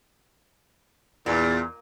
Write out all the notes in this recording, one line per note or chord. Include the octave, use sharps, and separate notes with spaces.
E2 A#2